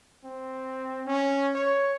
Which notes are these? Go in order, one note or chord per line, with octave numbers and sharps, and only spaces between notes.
C4
C#4
C#5